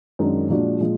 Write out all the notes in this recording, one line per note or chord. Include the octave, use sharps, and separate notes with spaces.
F#2 D#3 G#3 D4
A#2 F3 G#3 D4 F#4
A#2 F3 G#3